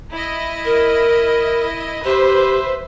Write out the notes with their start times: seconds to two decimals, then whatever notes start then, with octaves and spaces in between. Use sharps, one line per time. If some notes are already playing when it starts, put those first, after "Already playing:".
0.11 E4 D#5
0.65 A#4
2.05 G4 B4 C5 E5